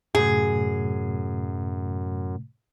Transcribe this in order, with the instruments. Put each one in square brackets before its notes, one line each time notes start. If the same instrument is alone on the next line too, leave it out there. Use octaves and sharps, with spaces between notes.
[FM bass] F#2 [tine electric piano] A2 C3 A3 [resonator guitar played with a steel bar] G#4